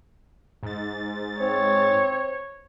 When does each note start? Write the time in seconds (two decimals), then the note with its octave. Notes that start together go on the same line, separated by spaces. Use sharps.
0.63 G#2 A6
1.40 C4 C#5